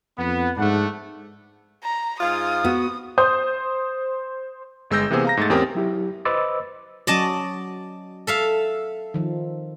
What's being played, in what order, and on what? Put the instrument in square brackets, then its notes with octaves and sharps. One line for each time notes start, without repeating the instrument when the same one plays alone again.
[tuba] F2 [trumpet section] B3
[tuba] G#2 [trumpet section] A3 D4 F#5
[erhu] A#5
[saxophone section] G#2 F4 F5 [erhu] D#6
[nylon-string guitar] B3 F#4
[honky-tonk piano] C5 D#6 G6
[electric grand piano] G1 G#3 E6 G6 A#6
C3 E3 A#3 B3 G#4 C5
F5 A#5 A#6
G#2 A3 A6
E2 C4 C#4 G4 A#4 D#6
[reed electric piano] F#3 E4 G4
B4 C5 D#5 D6 E6 A6
[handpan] F#3 C#4 F#4 [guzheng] D5 D#5 A5
[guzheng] A4 E5 F5
[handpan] D#3 F3